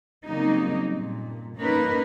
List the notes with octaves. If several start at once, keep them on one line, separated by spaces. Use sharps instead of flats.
C#3 F#3 G3 A#3 C4 D#4
G2 A#2
A#3 C#4 D#4 A#4 B4